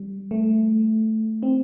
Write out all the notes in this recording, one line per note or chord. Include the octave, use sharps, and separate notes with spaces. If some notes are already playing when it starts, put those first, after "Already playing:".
Already playing: G3
A3
C4